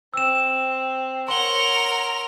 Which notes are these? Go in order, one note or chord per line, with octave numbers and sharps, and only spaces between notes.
C4 E6 E7
A#4 C#5 F#5 C6 F7 G7